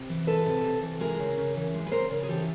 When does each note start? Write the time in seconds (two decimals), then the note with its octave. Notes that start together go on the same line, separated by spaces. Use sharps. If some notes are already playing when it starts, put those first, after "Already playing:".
Already playing: C3
0.09 E3
0.27 G#3 A4 B4
0.46 C3
0.64 C3
0.83 E3
1.00 G#3 G#4 A#4
1.19 C#3
1.38 C#3
1.56 E3
1.74 G#3
1.86 B4
1.92 C#3 A#4 C5
2.11 C#3
2.23 G#4
2.28 E3 G4 A4